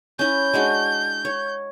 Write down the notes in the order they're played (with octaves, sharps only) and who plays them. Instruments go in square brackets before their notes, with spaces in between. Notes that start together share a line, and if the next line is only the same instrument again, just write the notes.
[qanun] C#4 E4 [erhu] G6
[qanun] G#3 D4 F#4
C#5